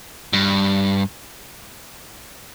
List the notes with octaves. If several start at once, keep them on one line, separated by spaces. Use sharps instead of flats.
G2